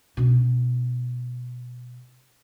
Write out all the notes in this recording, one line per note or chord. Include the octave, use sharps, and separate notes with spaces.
B2 C#4